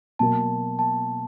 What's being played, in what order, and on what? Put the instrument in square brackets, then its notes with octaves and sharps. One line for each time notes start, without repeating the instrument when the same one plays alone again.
[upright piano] B2 F#3 A#3 [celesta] A5
[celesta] A5